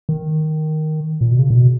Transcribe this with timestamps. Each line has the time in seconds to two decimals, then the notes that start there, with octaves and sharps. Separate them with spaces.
0.09 D#3
1.21 A#2
1.30 B2
1.39 C#3
1.50 A#2
1.55 B2